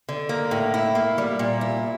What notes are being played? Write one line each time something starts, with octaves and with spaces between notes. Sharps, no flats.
D3
A#3
A2
E4
A#3
G3
A#2
E4